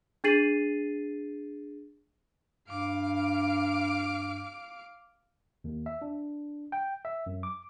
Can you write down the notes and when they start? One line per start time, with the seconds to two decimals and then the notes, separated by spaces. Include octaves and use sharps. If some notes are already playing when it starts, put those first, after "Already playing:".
0.24 D4 G#4 A6 C7 D#7 F#7
2.68 G2 F5 D6
5.64 D#2
5.86 E5
6.02 D4
6.72 G5
7.05 E5
7.26 F#2
7.43 D6